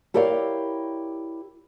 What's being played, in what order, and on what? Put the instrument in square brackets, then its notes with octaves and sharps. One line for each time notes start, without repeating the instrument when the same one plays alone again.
[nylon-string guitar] E4 G4 A#4 C#5 D5 F5